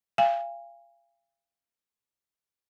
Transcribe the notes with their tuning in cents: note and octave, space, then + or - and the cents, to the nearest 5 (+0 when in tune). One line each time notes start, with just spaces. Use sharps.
F5 -30 G#5 -35